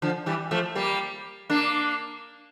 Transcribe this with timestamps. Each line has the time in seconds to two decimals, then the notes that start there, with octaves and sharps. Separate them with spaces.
0.02 D3 F3
0.26 E3 G3
0.51 F3 A3
0.75 G3 A#3
1.50 A#3 D4